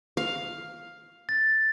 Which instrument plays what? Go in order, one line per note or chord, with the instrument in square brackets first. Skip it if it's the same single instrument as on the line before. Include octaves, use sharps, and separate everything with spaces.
[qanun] F5
[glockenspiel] A6